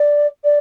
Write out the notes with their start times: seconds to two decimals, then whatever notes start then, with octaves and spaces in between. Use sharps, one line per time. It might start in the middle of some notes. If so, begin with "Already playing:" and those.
Already playing: D5
0.44 D5